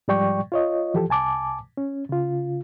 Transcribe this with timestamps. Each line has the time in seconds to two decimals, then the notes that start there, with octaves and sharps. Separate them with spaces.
0.08 G#2 F3 G3 D5 G5 C#6
0.52 F4 C#5 D#5
0.94 E3 F3 G4 A4
1.09 C2 G#5 A5 D6
1.77 C#4
2.09 C#3 F4